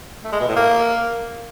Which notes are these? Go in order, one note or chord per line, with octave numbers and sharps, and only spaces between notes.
A3
G#3
B2
A2
A#3